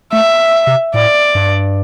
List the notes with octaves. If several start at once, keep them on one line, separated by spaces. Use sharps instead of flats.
A3 E5
C3
A2 D5
G2